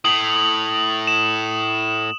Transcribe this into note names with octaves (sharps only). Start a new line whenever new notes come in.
A2 D#6 F#7
E7